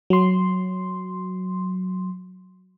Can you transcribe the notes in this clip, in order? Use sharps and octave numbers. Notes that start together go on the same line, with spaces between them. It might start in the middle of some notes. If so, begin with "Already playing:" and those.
F#3 C6